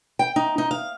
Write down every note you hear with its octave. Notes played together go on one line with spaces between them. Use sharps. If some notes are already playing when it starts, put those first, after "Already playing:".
G5
D#4
D#4
F5